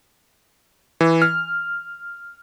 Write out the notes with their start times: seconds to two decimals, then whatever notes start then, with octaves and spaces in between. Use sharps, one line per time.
1.01 E3
1.22 F6